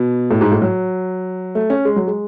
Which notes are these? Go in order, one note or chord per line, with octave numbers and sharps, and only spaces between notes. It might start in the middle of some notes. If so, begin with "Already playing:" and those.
Already playing: B2
A2
G#2
A2
F#3
A3
C#4
G#3
F#3
G#3